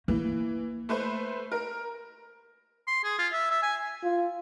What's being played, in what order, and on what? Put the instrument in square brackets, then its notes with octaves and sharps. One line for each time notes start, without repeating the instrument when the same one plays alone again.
[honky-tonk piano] E3 [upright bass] A#3
[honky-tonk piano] A3 B4 C5
A#4
[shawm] C6
G#4
F4
E5
E5
G#5
[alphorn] F4